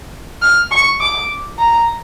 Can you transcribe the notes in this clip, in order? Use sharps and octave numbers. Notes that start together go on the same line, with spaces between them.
F6
C#6
D6
A#5